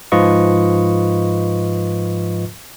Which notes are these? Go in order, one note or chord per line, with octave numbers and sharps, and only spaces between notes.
G#2 F3 F4 B4 D#5 C#6